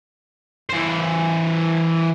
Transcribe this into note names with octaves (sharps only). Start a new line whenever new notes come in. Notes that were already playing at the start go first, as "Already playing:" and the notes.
E3 C5